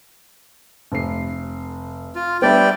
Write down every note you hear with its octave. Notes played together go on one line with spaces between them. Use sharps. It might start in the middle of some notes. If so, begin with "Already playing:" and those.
F1 C7
F4
G3 B3 D4 D5 E5 G5